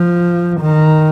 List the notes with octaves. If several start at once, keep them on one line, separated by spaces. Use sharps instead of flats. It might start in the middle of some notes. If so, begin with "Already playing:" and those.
Already playing: F3
D#3